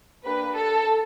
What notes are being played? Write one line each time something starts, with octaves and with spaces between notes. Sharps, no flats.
A#3 D4 G4 B4
A4